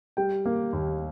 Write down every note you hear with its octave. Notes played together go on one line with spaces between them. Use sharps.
G3 G5
A#3
D#2